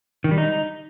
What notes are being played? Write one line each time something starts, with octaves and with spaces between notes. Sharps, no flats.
D#3
G3
D#4